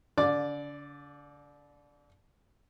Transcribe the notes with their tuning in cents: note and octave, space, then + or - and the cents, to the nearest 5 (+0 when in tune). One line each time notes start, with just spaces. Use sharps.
D3 -40 D5 +0 D6 +0